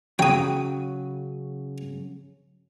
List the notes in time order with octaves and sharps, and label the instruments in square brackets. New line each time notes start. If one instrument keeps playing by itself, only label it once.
[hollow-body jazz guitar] C#3 F#3 [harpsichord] G5 D#6